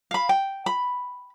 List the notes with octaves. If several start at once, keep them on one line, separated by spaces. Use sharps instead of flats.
F5 B5
G5
B5